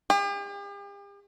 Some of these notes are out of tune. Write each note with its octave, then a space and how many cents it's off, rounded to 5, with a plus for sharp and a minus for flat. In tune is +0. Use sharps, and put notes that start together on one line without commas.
G4 +45